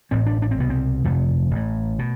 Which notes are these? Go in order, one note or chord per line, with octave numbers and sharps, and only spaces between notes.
A1 A2 C4
D4
D4
C4
C2 B2 B3
C4
G1 F2 C3 A3
A1 A2
B2